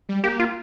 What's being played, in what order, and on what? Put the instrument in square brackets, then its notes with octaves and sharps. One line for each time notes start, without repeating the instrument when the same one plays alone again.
[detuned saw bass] G3
[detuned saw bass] A#3 [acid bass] G4
[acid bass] F4